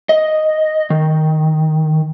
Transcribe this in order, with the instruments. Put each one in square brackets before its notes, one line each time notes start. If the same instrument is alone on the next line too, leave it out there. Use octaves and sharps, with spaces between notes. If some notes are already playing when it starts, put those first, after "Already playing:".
[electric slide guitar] D#5
D#3